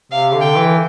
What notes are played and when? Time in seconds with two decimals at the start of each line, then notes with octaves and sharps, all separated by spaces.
0.12 C3 F5
0.33 D3
0.41 G5
0.56 E3